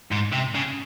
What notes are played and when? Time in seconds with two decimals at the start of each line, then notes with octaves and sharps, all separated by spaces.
0.12 G#2
0.33 C3
0.55 C#3